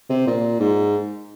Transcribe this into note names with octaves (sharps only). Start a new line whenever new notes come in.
C3
A#2
G#2